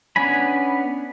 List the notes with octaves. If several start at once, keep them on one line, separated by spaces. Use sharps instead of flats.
B3 C#4 D4 G#5 B5